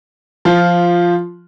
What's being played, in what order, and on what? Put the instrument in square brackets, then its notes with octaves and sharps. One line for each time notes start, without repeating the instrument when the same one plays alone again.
[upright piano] F3 F4